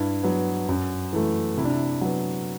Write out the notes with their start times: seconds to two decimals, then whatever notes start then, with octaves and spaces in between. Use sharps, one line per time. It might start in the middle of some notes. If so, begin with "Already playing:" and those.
Already playing: G2 E4
0.23 F#3 B3
0.69 F#2
1.13 E3 A3
1.57 C3 E4
1.65 D4
1.72 E4
2.01 F#3 B3